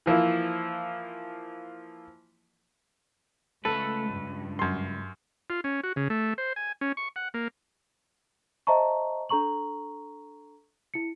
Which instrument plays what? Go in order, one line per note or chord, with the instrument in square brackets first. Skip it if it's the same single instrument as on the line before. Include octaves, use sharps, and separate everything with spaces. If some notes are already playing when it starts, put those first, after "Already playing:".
[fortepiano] E3 F3 A#3 E4
[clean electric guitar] C#2 B4 [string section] A3 [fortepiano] A4
[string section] G2
[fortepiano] F#2 C6
[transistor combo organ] F4
C#4
F#4
C#3
A3
C5
G#5
C#4
C#6
F#5
A#3
[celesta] C5 D#5 E5 A5 A#5 C#6
D4 A4 A#5 C#6 F#7
E4 C#7